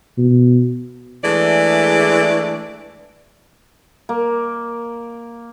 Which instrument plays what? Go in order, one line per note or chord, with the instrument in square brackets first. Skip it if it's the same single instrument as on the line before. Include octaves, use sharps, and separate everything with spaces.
[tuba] B2
[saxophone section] E3 G#3 A3 D4 G#4 D5
[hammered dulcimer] A#3